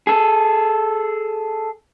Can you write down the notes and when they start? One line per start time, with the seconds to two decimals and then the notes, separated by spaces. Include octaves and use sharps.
0.07 G#4 A4